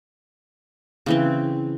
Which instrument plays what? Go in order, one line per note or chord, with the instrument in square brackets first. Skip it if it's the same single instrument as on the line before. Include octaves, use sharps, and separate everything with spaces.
[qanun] C#3 E3 C4